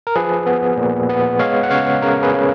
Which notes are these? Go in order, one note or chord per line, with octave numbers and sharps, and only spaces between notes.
A#4
F3 G#4 B4
B3
A#2
B3
G#3 C#5 F5
F#5
C#3 C#5 F5
C#3 A#4 C#5
G#4 B4
C#3